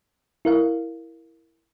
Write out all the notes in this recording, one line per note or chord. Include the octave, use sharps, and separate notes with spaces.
E4 A#4 F5